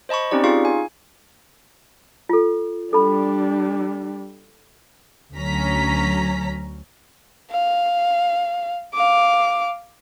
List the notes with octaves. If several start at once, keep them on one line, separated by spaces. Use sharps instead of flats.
C5 D#5 A5 B5 C#6
C4 C#4 D#4 G4 D5
D#4 F4 G#4 F5 C#6
G#5
F4 A4
G3 D4 A4 B5
D2 F#3 C#4 A#5 B6
F5
F5 D6